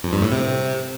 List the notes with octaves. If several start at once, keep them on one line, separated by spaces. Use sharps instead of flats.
F2
G2
A2
C3